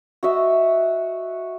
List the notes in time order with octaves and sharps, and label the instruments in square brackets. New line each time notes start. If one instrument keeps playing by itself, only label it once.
[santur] F#4 D#5 E5